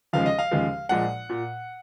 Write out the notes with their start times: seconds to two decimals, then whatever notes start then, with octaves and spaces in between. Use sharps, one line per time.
0.13 D#2 C#3 F3 G#3 F5
0.26 D#5
0.39 F5
0.51 D#2 C#3 F3 G#3
0.89 A#1 A#2 G#3 F#5
1.29 A#2